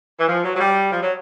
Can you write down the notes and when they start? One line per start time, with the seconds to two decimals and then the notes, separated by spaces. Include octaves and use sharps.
0.19 E3
0.28 F3
0.45 F#3
0.56 F#3
0.60 G3
0.92 F3
1.02 F#3